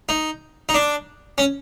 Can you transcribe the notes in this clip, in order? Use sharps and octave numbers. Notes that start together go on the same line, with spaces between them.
D#4
D#4
D4
C#4